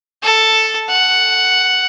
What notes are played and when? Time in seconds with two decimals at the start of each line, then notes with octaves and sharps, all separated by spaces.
0.23 A4
0.89 F#5